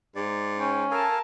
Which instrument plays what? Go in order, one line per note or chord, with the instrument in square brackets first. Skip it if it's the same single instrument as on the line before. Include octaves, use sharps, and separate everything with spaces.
[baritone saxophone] G#2 [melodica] D5
[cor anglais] C#4 [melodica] G5
[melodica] A4 F5 G#5 [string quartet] A#4 A5